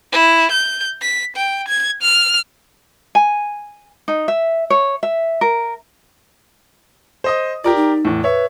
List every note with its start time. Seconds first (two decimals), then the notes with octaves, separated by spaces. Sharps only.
0.12 E4
0.51 G6
1.02 B6
1.36 G5
1.68 G#6
2.02 F6
3.15 G#5
4.08 D#4
4.28 E5
4.70 C#5
5.03 E5
5.41 A#4
7.24 C5 D#5 D#6
7.64 F4 G4 A#4 D5
7.76 D#4
8.05 E2 A2
8.24 B4 C#5 E5